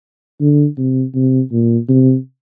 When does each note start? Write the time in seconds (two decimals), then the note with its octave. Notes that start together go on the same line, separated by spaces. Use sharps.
0.41 D3
0.78 C3
1.15 C3
1.52 A#2
1.89 C3